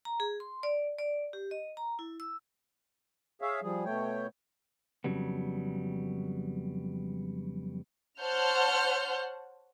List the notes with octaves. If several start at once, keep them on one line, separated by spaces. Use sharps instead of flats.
A#5
G#4
C6
D5
D5
G4
D#5
A#5
E4
E6
G#4 C#5 E5 F5
F3 G3 G#4
B2 A3 C#5 G5
F2 A#2 C#3 F#3 G3 B3
C5 C#5 F#5 A5 F6 G6